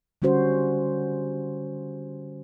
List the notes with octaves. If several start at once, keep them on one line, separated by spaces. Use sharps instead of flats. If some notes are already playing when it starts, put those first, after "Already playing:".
D3 G3 C#4 F#4 C5